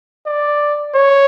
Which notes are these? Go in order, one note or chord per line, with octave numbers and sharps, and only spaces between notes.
D5
C#5